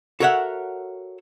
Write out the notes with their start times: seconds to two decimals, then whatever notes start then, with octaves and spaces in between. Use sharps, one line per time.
0.20 F#4 A4 A#4 C#5 E5 F#5